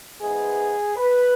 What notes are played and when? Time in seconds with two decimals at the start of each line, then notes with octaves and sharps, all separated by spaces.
0.21 G#2 E3 G#3 B3 G#4
0.97 B4